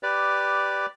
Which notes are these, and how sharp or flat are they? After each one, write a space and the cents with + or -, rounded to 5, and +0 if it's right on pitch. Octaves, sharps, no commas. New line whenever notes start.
G4 +0 B4 +0 D5 +0